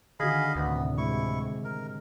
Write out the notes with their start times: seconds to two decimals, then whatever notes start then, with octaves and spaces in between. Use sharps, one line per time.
0.20 D3 D#3 F#4 G#4 D#5 F5 B5
0.55 D2 A2 C3 B3
0.98 G#3 E4 C#6
1.64 A#4